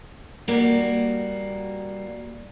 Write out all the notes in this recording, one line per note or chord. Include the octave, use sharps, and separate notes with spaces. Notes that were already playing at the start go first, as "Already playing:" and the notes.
G3 A#3 F#4